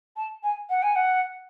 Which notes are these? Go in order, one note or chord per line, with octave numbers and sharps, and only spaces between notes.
A5
G#5
F#5
G#5
F#5